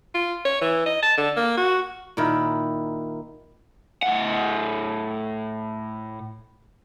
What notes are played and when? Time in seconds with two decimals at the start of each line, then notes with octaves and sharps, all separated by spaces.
0.15 F4
0.45 C#5
0.61 E3
0.86 D#5
1.02 A5
1.17 D3
1.37 A#3
1.57 F#4
2.17 A#2 D#3 E4
4.02 A2 F#5